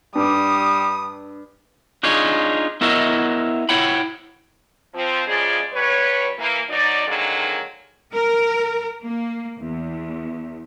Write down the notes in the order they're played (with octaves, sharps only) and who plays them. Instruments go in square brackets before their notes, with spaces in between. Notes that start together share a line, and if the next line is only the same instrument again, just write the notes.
[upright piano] G2 D6 [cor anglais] G3 [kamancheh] D#6
[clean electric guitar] D4 D#4 F4 G#4 C#5
B3 E4 A#4 C#5 D#5 E5
E4 C#5 F#5 G5 B5
[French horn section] F3 C4
E2 C#3 F3 G#3 G#4 D5
D3 G3 B4 C#5
E3 A#3
B2 F#3 D#4 D5
F2 D3 D#3 F#3 G#3 A#3
[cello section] A#4
A#3
E2